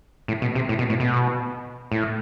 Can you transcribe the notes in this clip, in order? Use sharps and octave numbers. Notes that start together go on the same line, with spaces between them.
A2
B2
C3
A2
B2
A2
B2
A2